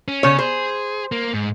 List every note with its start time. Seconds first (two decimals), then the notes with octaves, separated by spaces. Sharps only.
0.08 C#4
0.23 C#3 C#5
0.39 G#4 C5
1.12 A#3
1.34 G#2